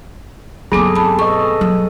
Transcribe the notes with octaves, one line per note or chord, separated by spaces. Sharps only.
G2 F#3 B3 C4 G#4 A4 D6
A5 B5
B2 A4 D#5 C#6
F#3